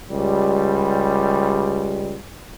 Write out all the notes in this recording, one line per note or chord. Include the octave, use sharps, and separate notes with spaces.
C#2 G3